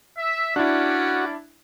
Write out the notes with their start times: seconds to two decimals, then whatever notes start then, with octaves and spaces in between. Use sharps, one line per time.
0.17 E5
0.56 G3 C#4 D4 E4 F#4 D5